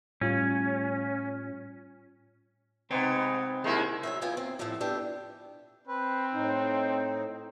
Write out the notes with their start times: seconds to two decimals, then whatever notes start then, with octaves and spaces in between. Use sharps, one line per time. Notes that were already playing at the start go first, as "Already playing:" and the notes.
0.21 A2 G3 C#4 F4
2.91 G#2 C3 B3 C4 D#4 C#5
3.64 D#2 G#3 E4
4.03 D2 F#3 E5
4.21 E2 E3 B3 F4 G5 G#5
4.37 C4
4.59 A2 F3 G3 A3 C4
4.81 G3 B3 D4 E4 G4
5.87 C4 B4
6.33 A2 D#4